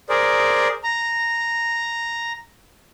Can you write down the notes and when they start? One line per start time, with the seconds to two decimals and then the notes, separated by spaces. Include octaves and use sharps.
0.09 G#4 A#4 C5 D5
0.84 A#5